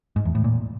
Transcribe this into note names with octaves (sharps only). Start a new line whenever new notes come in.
G#2
E2
A2
A#2